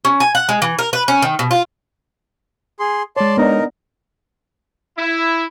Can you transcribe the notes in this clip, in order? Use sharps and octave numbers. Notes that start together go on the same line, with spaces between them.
C#4
G#5
F#5
G#3
E3
A#4
B4
C#4
D#3
B2
F4
G#4 C6
G#3 C#5 D5 A5 C6
B3 D4 D#4 A#4
E4